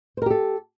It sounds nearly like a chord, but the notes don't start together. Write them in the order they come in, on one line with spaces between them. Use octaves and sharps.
C5 A#4 G4 A4